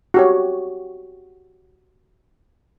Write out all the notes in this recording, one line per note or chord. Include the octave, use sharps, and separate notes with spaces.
F#4 G4 C#5